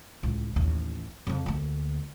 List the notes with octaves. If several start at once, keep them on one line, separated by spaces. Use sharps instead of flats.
C#2 A2
A1 D#2
F2 C#3
D2 A#3